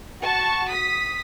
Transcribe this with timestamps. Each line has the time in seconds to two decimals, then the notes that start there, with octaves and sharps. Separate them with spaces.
0.22 F#4 A5 C#6
0.69 D#6 B6